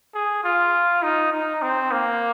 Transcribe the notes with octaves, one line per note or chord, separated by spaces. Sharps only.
G#4
F4
D#4
D#4
C4
A#3